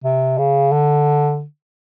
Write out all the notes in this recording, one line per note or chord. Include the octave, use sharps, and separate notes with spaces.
C3
C#3
D3